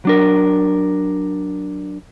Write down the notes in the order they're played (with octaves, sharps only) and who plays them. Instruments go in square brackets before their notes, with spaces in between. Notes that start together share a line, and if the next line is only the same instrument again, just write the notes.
[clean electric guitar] F#3 D4 A#4